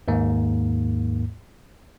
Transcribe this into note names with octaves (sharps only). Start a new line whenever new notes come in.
D#2 G#2 A#3